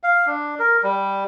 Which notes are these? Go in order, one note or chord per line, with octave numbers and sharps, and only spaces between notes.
F5
D4
A#4
G3